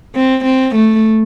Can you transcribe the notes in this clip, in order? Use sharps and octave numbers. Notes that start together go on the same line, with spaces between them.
C4
C4
A3